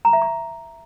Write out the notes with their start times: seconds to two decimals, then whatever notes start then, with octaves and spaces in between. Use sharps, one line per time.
0.05 A#5
0.13 E5
0.22 C#6